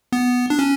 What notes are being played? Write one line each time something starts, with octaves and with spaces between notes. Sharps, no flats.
B3
D4
C#4